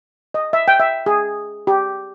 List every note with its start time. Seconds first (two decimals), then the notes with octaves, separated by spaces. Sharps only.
0.34 D#5
0.53 E5
0.68 G5
0.80 E5
1.06 G#4
1.67 G4